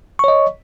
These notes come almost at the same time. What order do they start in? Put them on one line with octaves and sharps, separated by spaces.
C#6 C#5 D#5